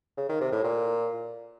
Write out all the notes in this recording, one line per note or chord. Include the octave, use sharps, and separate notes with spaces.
C#3
D#3
C3
A2
A#2